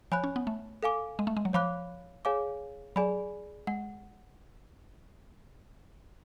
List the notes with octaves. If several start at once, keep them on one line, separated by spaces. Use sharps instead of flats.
F3 C#5 G#5 B5 F#6
C#4
B3
A3
A4 F5 G#5 D6
G#3
A3
G#3
F#3
F3 C#5 F5 B5 D6 F#6
G#4 C#5 F5 G#5 D6
F#3 G#4 D5 G#5 B5
G#3 F#5